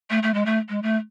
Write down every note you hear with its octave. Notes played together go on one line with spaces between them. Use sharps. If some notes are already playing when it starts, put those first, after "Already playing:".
A3
A3
G#3
A3
G#3
A3